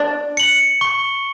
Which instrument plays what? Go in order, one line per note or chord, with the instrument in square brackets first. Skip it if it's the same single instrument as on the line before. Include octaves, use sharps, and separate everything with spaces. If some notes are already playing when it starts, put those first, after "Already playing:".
Already playing: [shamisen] D4
[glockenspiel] C#7 F#7
C#6